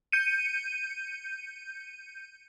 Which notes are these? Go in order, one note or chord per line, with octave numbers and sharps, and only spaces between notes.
G6 C#7 D#7